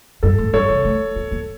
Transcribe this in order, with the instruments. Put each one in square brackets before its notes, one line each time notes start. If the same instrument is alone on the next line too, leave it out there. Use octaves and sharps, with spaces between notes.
[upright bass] G2 [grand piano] A4
[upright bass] A2
[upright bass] G2 [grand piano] A4 C#5
[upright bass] C#3
A3
A#3
A#3